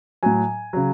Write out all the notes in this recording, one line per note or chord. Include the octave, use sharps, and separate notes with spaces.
A2 F#3 G#5
C#3 F#3